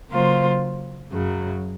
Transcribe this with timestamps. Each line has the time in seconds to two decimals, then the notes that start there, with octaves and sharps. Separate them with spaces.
0.10 C#3 F#3 A#3 F4 C5
1.11 F#2 C#3 F#3